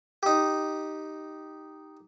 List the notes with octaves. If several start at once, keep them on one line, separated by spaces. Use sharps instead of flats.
D#4 G4